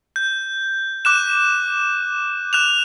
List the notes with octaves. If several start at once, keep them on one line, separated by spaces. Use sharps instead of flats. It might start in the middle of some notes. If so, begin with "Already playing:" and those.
G6
D6 F#6 E7
F#6 E7 F7